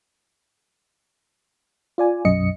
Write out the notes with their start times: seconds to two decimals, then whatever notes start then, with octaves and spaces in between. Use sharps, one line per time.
1.98 F4 D5 G#5
2.25 B1 F#2 D#5 C#7